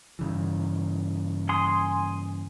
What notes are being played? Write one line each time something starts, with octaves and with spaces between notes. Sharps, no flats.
G2 C#3 E3
G#5 C6 D#6